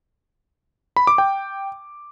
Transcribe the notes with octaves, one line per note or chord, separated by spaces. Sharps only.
B5
D6
G5